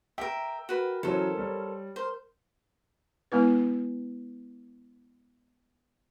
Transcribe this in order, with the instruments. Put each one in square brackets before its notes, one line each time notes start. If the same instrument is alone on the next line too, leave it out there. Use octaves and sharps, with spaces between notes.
[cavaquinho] A#4 E5 [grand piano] G5
[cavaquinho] F#4 B4 [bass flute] A#4
[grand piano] E3 F#3 C#4 [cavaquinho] A4 C5
[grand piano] G3 C#5
[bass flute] A#4 [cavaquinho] C5
[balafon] G#3 B3 E4 B4